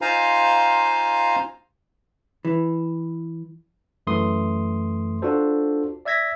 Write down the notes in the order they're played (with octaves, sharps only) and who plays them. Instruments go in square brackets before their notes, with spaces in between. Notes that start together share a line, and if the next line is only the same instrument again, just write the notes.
[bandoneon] D#4 F4 C5 F5 G#5 A#5
[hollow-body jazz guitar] E3
[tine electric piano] F#2 E3 A3 C6 D#6
D4 F4 F#4 A4 C5
D5 E5 E6 G#6 A#6 B6